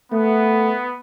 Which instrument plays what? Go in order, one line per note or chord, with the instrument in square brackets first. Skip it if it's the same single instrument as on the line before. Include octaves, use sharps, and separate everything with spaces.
[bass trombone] A3 [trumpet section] B3